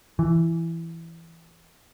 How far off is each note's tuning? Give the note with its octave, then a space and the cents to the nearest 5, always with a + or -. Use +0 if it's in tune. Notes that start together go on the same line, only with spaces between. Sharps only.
E3 +10